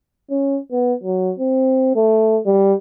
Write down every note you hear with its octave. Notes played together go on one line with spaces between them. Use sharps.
C#4
B3
F#3
C4
A3
G3